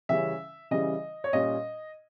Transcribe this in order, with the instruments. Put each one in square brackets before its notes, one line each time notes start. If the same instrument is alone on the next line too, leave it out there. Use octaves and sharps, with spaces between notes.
[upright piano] C#3 E3 G3 C#4 E5
C#3 E3 G3 C#4 D#5
C#5
A#2 G3 C#4 D#5